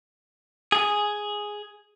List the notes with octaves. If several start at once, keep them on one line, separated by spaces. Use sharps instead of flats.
G#4